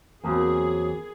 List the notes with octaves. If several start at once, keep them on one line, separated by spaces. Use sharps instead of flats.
E2 F#3 A#3 C4 G#4 A#4 A5 B5